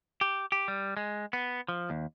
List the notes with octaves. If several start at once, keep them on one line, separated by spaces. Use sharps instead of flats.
G4
G4
G3
G#3
B3
F3
D#2